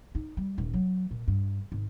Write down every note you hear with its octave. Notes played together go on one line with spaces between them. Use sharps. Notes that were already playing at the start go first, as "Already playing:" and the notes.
D#4
G3
D#1
F#3
A#2
G2
G#1